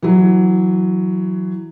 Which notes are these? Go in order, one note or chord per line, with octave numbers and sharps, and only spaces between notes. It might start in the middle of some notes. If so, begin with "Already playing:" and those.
E3 F#3